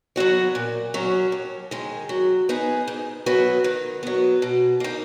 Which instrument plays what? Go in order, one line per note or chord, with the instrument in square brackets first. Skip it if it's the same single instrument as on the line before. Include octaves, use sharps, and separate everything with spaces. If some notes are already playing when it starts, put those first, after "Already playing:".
[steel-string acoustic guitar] F#3 B3 F#4 C#5
A#2
F#3 C#4
D#2
D#3 G#3
F#3
B3 D#4 G#4
G#2
F#3 B3 F#4 B4
D#3
F#3 B3
B2
A#3 D#4